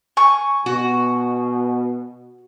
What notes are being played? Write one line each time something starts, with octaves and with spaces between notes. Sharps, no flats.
G#5 C#6
B2 F#4